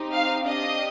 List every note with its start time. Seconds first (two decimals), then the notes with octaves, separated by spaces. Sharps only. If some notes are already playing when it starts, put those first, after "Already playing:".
Already playing: C4 D#4 G4
0.13 F5
0.47 D4 G4 D#5